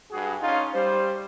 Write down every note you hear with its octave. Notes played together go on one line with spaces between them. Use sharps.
G2 F#4 G#4
C#4 D#4 F4
G3 C5